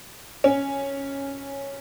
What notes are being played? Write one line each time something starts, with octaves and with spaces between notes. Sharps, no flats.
C#4